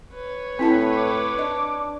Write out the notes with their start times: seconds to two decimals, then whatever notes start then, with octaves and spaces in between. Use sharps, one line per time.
0.15 B4 C#5
0.59 A2 C4 E4 A5 B5
0.97 D6
1.39 D4 D#5